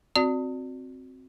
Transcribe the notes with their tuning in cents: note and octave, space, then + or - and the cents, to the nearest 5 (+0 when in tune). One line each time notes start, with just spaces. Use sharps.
C4 +0 F#4 -15 D5 +0